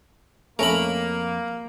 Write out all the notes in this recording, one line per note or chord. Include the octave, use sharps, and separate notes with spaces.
C2 F2 A3 A#3 C#4 A#4 B5